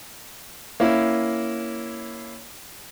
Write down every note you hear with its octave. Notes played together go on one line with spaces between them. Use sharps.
A#3 C#4 E4